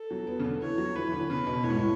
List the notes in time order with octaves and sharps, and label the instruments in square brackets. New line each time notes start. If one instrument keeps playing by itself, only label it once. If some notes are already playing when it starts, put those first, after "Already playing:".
Already playing: [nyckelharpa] A4
[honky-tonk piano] F#3
B3
C#3
D3
[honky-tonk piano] E3 [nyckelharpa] C#5
[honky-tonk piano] F#3
[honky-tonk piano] E3 [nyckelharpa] B4
[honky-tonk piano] E3
D3
[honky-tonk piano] C#3 [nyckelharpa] B4
[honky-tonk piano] B2
[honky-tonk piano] A2 [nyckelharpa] C#5
[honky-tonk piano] G#2
A2